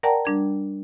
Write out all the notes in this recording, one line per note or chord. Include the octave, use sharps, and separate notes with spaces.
A#4 D5 F#5 G5 A5 A#5
G3 D4 G#6